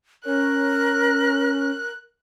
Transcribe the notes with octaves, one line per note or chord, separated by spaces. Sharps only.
C#4 A#4 F#6